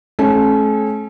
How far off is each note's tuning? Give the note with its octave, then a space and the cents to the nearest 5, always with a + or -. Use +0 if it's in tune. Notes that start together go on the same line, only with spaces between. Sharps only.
A3 -40 C#4 -30